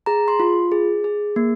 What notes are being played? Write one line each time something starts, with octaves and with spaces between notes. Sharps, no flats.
G#4 A#5
C6
F4
G#4
G#4
A#3